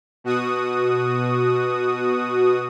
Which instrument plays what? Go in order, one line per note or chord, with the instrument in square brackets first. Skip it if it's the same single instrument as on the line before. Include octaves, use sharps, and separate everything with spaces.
[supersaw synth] B2 F#4 D#6